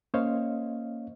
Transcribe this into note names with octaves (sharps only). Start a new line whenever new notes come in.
A#3 C#4 C5 C#5 D#5 F5